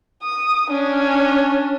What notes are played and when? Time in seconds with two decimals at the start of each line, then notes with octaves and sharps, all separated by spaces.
0.23 D#6
0.70 C#4 D4